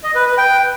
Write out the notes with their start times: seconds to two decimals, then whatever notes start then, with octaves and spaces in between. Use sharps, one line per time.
0.04 D#5
0.15 B4
0.26 B4
0.38 G5